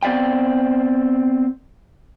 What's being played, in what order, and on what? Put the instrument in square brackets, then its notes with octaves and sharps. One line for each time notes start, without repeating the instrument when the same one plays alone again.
[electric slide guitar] B3 C4 D5 F5 G5